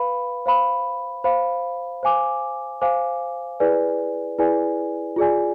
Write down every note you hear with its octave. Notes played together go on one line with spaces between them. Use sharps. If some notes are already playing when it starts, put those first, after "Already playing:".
Already playing: B4 F5 B5
C5 F5 B5
C5 F5 B5
C5 F5 G#5 D6
C5 F5 G#5 D6
E4 G#4 B4 D5 G#5
E4 G#4 B4 D5 G#5
F4 G#4 D5 G#5